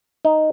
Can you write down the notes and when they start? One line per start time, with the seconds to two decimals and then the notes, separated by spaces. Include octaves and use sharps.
0.25 D#4